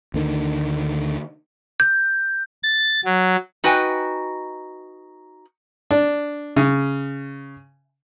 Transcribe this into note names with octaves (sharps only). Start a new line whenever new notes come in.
D2 D3 D#3
G6
A6
F#3
D#4 F#4 B4 D#5 G5 G#5
D4
C#3